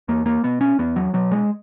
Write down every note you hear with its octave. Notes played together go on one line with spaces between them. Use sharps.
E2 A#3
A#3
B2 B3
C#4
E2 B3
F#3
B2 F#3
G#3